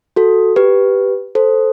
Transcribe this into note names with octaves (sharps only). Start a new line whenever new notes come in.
F#4 A4
G4 B4
A4 C5